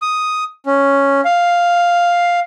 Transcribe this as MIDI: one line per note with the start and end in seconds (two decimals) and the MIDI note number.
0.02 0.44 87
0.66 1.21 61
1.25 2.40 77